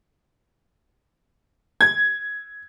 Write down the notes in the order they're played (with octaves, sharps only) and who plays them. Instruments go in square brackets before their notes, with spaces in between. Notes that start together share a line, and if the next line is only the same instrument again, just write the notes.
[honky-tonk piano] G#6